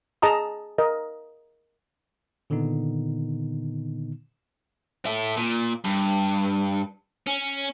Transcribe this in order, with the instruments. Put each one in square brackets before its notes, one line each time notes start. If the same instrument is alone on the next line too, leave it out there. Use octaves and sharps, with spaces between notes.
[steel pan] G#4 D#5 A5 A#5 D#6
A#4 D#5
[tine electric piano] A#2 D3 D#3 B3 D#4
[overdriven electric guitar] E4 A4
A#2
G2
C#4